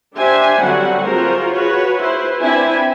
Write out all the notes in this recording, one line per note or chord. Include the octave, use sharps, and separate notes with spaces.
D4 G4 C5 E5 G#5
D3 F#3 G3 C4 F#4 F#5
F4 F#4 G#4 A#4 C5
F#4 G#4 B4 C#5
E4 B4 C5
C4 D4 E4 B4 E5 G#5